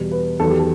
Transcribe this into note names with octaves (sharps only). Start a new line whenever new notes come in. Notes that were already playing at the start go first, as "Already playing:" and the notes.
Already playing: E2 B2 G3
B4
E2 D#3 F#3 A4
G4
A4